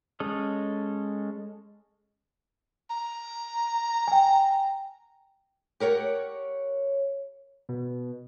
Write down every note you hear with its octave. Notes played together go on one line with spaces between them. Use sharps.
G#3 C#4 A4 D#5
A#5
G5 G#5
G4 A#4 C#5 F#5
B2